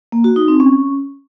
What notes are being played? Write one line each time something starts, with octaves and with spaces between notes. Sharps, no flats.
A#3
F#4
D#4
C4
C#4